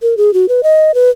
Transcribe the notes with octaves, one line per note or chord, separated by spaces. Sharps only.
A#4
G#4
F#4
B4
D#5
B4